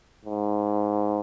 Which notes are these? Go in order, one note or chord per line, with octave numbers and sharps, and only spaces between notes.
G#2